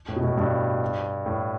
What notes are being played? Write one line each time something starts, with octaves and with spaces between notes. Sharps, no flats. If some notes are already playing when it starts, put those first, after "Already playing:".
A2
B2
A2
G2
A2